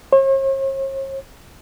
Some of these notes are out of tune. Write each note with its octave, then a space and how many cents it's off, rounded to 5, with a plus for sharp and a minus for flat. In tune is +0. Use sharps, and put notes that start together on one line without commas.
C#5 -45